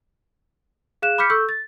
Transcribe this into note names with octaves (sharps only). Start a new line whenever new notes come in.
G#4 F5 F#6 E7
B5 D6 F6 G6 B6 C#7
A4 C#6 E6 G6
A6